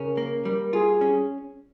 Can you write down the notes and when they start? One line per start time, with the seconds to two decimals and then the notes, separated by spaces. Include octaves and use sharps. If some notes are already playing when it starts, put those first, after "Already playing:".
Already playing: C#3 C#4 A#4
0.17 A#3
0.45 G3
0.73 F4 G#4
1.01 C#4